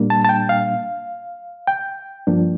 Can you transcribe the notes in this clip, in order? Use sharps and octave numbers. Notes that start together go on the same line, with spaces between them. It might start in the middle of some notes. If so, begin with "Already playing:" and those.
Already playing: A#2 G3 A#3 D4
A5
A5
G5
F5
G5
G2 F3 A#3 D4